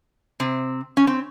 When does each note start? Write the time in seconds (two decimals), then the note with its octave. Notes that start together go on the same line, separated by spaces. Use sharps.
0.40 C3 C4
0.97 C#4
1.07 C4